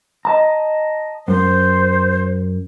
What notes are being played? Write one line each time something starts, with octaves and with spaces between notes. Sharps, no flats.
D#5 A5 A#5
F#2 C5